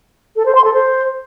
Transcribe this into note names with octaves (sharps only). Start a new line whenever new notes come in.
A4
C5
C6
A4
C5